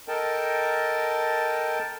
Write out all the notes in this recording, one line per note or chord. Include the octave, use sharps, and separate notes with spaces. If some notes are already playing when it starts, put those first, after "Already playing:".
A4 A#4 D#5 G5 A5